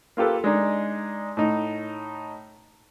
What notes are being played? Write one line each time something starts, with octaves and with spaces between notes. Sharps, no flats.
A#3 F4 G4 A4 B4
G#3 D4 D#4
A2 D#4